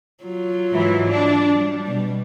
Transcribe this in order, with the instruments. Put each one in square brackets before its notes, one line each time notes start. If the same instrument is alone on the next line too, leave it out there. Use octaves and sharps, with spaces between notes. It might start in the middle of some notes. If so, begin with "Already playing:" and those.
[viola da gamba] F#3 F4
[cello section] G#2 E3 E4
D4
G3
[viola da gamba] B2